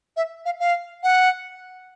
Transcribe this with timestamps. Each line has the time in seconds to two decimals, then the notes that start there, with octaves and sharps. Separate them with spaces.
0.17 E5
0.45 F5
0.60 F5
1.03 F#5